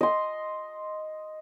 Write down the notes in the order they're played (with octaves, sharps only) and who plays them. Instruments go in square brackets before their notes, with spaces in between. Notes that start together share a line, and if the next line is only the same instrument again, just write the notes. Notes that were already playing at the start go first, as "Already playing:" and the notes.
[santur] D#5 C6